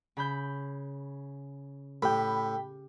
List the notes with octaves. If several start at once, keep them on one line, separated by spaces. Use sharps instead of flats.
C#3 B5 G6
A2 G4 G5 B5